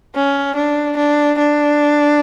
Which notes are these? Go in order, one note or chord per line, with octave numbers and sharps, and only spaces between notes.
C#4
D4
D4
D4